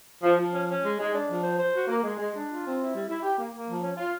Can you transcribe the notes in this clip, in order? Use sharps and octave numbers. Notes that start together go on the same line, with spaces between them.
F3
F3
C#4
C#4
G#3
G#3
D4
F3
C5
C5
F#4
A#3
G#3
G#3
D4
F4
C4
E4
G3
E4
G4
A#3
A#3
F3
C#4
F4